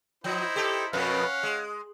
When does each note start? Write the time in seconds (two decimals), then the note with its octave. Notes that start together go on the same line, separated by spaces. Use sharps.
0.24 F3 D#4 E4 C5
0.56 G4 A4
0.93 F2 B2 C#4 B4 F5 F#5
1.43 G#3